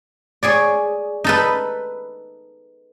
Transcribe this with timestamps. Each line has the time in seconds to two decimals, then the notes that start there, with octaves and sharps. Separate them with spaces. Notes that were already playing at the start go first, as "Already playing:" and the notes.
0.43 G#4 C#5 D5
1.24 D#4 A4 B4